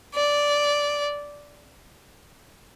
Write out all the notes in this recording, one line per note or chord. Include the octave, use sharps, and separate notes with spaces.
D5